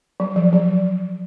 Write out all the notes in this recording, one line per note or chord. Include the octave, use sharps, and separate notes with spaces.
F#3
F3
F#3